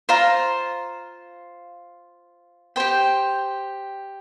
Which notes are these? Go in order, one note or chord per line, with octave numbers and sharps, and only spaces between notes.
F4 C5 F5 A#5
G4 C5 G5